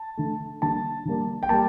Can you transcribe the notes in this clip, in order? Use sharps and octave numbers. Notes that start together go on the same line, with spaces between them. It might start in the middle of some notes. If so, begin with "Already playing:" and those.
Already playing: A5
D3 A3
D3 G3 A#3 A5
D3 G3 A#3
G5
G3 A#3 A5